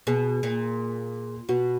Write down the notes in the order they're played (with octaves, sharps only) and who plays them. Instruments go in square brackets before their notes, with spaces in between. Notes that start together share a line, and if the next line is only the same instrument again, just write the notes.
[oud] B2 [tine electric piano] G#4
[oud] A#2
[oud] B2 [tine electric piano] F#4